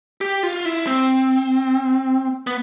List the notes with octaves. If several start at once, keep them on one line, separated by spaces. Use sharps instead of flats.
G4
F4
E4
C4
B3